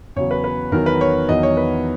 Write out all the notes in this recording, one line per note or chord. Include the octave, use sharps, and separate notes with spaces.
E2 C#3 F#3 C#5
B4
B4
E2 D#3 F#3 A#4
B4
C#5
E2 D#3 F#3 D#5
C#5
B4